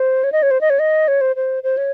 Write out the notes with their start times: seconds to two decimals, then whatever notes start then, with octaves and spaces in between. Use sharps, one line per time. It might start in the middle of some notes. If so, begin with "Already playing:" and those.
Already playing: C5
0.24 C#5
0.32 D#5
0.43 C#5
0.51 C5
0.61 D#5
0.70 C#5
0.79 D#5
1.08 C#5
1.21 C5
1.36 C5
1.63 C5
1.77 C#5